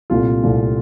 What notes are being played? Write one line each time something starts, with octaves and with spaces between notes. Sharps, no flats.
C2 A#2 A3 C4 F4
C2 A#2 A3 C4